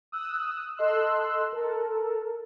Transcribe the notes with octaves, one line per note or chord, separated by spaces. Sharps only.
D#6 E6 F#6
A4 D#5 C6 E6 F#6
A4 A#4